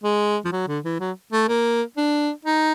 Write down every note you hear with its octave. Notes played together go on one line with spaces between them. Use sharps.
G#3
F3
F#3
D3
E3
F#3
A3
A#3
D4
D#4